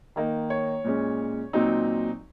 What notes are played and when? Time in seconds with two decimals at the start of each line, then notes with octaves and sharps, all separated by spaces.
0.16 D#3 A#3 D#4
0.50 C#5
0.84 A#2 G#3 C#4
1.53 A#2 F#3 C4 D#4